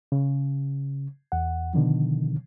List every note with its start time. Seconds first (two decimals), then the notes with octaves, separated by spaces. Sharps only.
0.12 C#3
1.32 E2 F#5
1.74 B2 D3 D#3 F3